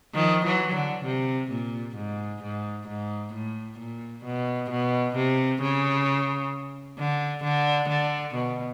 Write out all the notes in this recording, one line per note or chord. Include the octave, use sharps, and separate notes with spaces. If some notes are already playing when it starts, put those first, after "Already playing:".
D#3 F3
E3 F#3
D3
C3
A#2
G#2
G#2
G#2
A2
A#2
B2
B2
C3
C#3
D3
D3
D3
B2